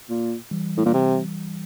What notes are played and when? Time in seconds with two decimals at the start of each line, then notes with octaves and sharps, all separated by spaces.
0.09 A#2
0.51 E3 G3
0.77 A2
0.86 A#2
0.94 C3